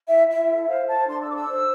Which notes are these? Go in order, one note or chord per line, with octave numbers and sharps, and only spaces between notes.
E4 E5
E4 E5
A4
C5 F5
A4 A5
D4 C6
E6
A4 D6
E6
C5